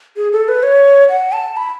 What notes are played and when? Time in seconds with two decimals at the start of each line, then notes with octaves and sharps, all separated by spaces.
0.17 G#4
0.32 A4
0.48 B4
0.63 C#5
1.09 F#5
1.32 A5
1.57 B5